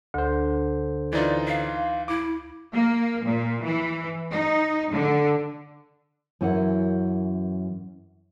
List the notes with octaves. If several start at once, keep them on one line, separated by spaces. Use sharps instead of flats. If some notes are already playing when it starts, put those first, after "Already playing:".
D2 D3 C5
E3 D#4 F4 D5
F5
E4 D6
A#3
A#2
E3
D#4
D3
F#2 E3 C#4 F#4 A#4 F#5